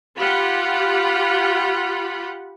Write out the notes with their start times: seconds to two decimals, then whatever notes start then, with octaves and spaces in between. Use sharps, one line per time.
0.18 F4 G4 F#5 B5